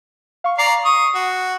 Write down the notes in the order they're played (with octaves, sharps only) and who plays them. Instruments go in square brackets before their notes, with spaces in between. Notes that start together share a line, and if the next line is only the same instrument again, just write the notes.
[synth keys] F5 C#6
[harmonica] D5 F5 A#5 [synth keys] C7
[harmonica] C#6 D#6
F#4